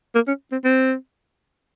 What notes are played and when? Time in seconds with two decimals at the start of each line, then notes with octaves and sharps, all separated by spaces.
0.15 A#3
0.27 C#4
0.52 C4
0.64 C4